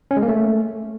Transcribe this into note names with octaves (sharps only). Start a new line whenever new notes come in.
C#4
G#3
A#3
A3